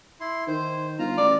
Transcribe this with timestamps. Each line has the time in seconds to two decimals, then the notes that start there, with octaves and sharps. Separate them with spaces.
0.20 E4 C6
0.48 D#3 C5
0.99 G1 F4 A#5
1.18 A1 D5